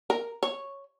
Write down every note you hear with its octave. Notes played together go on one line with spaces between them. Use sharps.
A#4
C#5